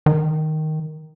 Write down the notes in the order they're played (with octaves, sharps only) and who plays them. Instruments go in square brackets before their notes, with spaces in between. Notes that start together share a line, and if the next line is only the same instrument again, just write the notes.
[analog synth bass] D#3